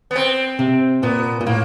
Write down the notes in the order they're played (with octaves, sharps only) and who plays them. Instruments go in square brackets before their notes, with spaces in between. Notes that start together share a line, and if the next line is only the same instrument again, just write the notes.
[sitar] B3
C4
[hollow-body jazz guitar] C3
[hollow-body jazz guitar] A#2 [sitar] B3
[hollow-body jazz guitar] A#2
[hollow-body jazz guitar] A2 [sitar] A#3